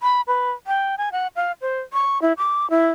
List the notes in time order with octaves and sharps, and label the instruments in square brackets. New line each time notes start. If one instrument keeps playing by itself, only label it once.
[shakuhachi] B5
B4
G5
G#5
F#5
F5
C5
C#6
E4
D6
E4